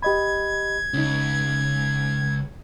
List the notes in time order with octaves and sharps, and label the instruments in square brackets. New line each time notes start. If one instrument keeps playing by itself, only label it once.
[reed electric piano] G4 D#5 B5 [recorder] G#6
[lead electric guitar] C#2 [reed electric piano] C#4 D#4